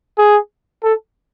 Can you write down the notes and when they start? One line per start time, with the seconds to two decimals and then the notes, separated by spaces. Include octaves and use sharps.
0.18 G#4
0.83 A4